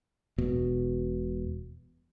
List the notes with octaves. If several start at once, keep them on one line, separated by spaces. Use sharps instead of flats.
E1 B2